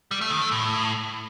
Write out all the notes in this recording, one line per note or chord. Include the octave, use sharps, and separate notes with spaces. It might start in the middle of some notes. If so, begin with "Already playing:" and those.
G3
A3
D#3
A3
A2